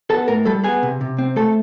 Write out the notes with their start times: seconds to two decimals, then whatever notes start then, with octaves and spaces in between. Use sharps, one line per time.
0.10 B3 A4 A5
0.28 A2 A#4 A#5
0.45 G3 A4 A5
0.64 B3 G#4 G#5
0.83 C3
1.01 C3
1.18 C4
1.36 A3 A4 A5